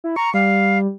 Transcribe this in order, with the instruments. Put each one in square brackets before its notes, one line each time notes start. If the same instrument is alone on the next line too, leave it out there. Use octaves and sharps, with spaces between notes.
[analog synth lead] E4
[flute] A#5 [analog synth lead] C#6
[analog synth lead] G3 [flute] F5